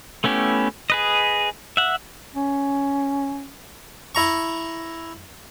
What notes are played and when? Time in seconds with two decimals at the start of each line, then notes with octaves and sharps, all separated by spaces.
0.24 A3 B3 C#4 E4 G4
0.90 G#4 B4 D#5
1.77 E5 F#5
2.34 C#4
4.15 E4 A#5 C#6